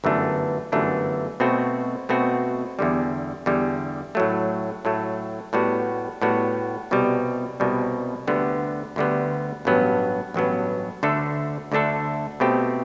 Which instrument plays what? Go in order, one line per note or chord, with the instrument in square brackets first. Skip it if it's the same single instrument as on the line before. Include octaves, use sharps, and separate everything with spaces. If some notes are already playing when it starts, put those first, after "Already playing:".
[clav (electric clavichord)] G1 F#2 E3 A3 D4
G1 F#2 E3 A3 D4
B2 A3 C4 F#4
B2 A3 C4 F#4
E2 D3 G3
E2 D3 G3
A2 F#3 A3
A2 F#3 A3
A2 G3 B3 F#4
A2 G3 B3 F#4
C2 B2 G3
C2 B2 G3
D2 D3 G3 B3
D2 D3 G3 B3
A1 G2 F#3 B3
A1 G2 F#3 B3
D2 D3 A3 D4 A4
D2 D3 A3 D4 A4
B2 A3 C4 G4